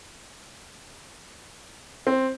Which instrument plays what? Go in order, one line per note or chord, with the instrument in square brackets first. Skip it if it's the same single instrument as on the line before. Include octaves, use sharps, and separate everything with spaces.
[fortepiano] C4